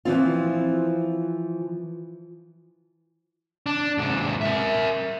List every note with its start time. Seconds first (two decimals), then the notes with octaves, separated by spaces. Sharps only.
0.05 E3 F3 C4 F4
3.66 D4
3.98 G#2 C3
4.41 A#4 E5